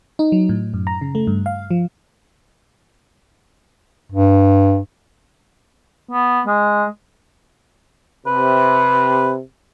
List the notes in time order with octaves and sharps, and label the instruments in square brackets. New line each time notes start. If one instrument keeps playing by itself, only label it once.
[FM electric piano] D#4
F#3
A2
F#2
A#5
C#3
A3
G2
F5
F3
[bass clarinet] G2
[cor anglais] B3
G#3
[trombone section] C3 [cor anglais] B4